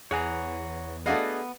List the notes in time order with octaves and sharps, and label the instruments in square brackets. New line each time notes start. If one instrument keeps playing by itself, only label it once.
[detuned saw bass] E2 [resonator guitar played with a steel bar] E3 [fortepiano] G#4 [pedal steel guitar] C#5 F#5 A#5
[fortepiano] A3 F#4 F5 [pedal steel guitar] B3 [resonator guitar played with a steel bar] D4 G#4 D#5